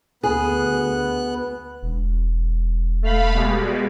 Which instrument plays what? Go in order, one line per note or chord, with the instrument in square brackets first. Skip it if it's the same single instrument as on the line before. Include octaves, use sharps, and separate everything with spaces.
[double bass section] D2 [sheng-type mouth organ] B3 F#6 [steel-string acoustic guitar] G#4
[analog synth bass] E1
[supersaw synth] A3 F5 B5
B2 G3 G#3